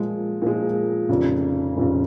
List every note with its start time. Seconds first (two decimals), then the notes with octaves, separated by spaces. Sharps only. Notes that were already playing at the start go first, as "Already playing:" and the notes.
Already playing: A#2 F3 G#3
0.42 A#2 F3 G#3
1.09 F1 F2 C#3
1.76 F1 F2 C#3